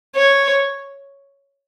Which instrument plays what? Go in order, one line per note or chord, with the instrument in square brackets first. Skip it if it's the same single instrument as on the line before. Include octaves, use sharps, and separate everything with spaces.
[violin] C#5